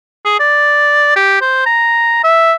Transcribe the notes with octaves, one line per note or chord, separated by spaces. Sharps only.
G#4
D5
G4
C5
A#5
E5